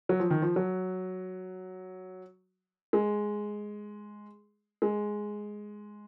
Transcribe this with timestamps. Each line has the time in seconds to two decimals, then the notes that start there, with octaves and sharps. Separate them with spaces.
0.09 F#3
0.20 F3
0.30 D#3
0.42 F3
0.56 F#3
2.93 G#3
4.82 G#3